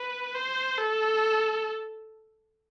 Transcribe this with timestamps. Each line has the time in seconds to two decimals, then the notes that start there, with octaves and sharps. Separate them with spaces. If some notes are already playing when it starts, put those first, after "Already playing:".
Already playing: B4
0.35 C5
0.78 A4